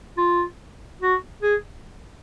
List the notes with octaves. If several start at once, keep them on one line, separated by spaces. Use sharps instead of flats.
F4
F#4
G#4